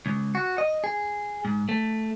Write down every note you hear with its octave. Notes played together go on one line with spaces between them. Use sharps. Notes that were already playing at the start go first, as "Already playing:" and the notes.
C#2
F#4
D#5
G#4
G#2
A3